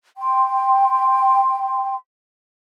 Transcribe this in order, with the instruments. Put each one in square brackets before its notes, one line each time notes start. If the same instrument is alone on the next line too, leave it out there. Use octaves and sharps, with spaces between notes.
[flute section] G5 C6